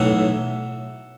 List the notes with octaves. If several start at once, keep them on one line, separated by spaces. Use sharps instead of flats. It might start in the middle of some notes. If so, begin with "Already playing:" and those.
Already playing: B1 A2 E3 E5 F#5